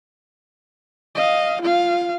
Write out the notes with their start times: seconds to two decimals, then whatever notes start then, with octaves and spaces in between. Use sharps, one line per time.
1.15 D#5 F5
1.62 F4 F5